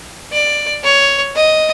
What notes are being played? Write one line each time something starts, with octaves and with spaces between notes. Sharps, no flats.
D5
C#5
D#5